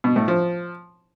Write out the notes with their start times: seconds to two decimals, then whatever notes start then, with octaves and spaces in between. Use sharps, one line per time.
0.04 B2
0.16 A2
0.28 F3